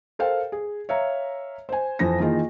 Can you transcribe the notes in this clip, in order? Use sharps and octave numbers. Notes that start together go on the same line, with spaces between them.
A4 A#4 C5 F5 G5
G#4
C#5 E5 F5 A#5
C5 G#5
F2 E3 F3 C5 A#6
D#3 E3 A#3 D#4 F4 G#4